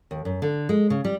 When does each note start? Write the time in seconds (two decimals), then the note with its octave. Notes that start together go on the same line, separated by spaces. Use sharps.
0.11 D#2
0.25 F#2
0.42 D3
0.69 G#3
0.90 C#3
1.04 G3